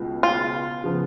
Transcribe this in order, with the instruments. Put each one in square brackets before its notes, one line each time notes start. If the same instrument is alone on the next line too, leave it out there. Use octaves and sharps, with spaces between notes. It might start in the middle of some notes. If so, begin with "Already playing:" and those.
Already playing: [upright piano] C#2 B2 G#3
[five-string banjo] F4
[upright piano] C#3 F3 B3